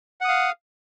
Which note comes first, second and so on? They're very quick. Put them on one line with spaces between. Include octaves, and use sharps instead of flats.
F#5 D#6 F5